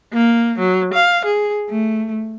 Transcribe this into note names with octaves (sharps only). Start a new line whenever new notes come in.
A#3
F#3
F5
G#4
A3